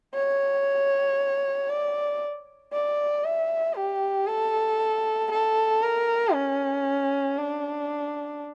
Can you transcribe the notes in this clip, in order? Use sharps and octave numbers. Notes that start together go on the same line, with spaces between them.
C#5
D5
D5
E5
G4
A4
A4
A#4
C#4
D4